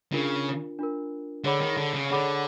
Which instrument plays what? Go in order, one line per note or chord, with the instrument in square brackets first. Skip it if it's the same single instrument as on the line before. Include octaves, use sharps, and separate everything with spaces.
[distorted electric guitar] C#3 [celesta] D4 F4 A#4
[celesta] D4 F4 A#4
[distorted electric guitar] D3 [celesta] G#4 C#5 F#5 B5 D6
[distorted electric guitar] D#3
D3
C#3
[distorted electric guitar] D3 [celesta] G#4 C#5 F#5 B5 D6